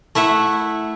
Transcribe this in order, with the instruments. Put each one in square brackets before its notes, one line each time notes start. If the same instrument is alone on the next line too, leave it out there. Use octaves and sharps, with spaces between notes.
[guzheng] A3 E4 E5 F#5